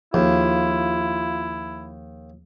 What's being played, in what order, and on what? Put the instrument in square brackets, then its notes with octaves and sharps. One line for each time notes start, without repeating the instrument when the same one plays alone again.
[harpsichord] D#2 [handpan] F3 G#4 [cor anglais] E4 [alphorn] F4